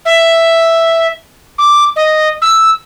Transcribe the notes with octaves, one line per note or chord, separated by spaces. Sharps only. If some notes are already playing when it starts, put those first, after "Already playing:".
E5
D6
D#5
E6